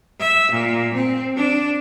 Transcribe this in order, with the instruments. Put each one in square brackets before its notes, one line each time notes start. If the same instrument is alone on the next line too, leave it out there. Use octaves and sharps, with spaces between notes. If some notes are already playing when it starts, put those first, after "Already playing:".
[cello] E5
A#2
C4
D4